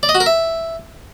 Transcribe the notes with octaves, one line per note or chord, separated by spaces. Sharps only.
D5
D#5
F#4
A#4
E5